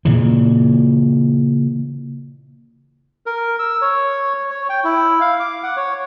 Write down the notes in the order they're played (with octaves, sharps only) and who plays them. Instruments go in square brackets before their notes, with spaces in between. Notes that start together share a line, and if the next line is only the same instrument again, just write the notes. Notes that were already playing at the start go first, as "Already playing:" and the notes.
[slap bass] A#2 C#3 E3
[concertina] A#4
E6
C#5
C#5
G5
E4
F5
D6
F#5
C#5